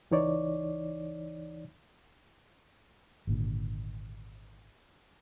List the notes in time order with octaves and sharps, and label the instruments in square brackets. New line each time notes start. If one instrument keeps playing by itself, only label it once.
[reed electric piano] C#2 E3 D#4 C#5 D5
[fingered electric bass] G#1 A#2 D3